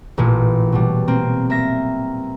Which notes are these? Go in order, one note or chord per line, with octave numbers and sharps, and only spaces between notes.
A1 A#2
B2 F#3 G3
A#3 C4
A#3 E5 A#6